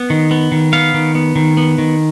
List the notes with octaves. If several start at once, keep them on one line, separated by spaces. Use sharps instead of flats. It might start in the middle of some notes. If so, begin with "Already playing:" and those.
Already playing: B3
D#3
B3
D#3
B3 F5
D#3
B3
D#3
B3
D#3